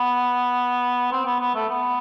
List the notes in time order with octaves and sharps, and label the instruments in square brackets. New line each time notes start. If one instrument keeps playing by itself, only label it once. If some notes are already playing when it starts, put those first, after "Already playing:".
Already playing: [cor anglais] B3
C4
B3
B3
A3
B3